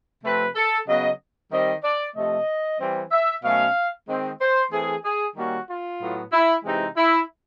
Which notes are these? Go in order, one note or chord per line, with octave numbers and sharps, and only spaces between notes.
C3 F3 A3 C4 B4
A4
C#3 F#3 B3 D#5
D#3 G3 C4 D#5
D5
C3 F3 A3 D#5
E3 G3 C4
E5
B2 F#3 A3 C#4 F5
D#3 G#3 C4
C5
E3 A3 C4 G#4
G#4
D#3 G3 A#3 C#4 F#4
F4
A2 F#3 B3
E4
C3 E3 G#3 C4 D#4
E4